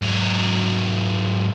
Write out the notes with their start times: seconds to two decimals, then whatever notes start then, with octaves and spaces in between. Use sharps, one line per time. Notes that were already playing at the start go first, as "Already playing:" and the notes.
0.02 G#2 F#3